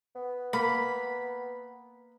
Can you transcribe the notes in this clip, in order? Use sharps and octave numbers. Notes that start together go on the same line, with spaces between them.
B3
A#3 B5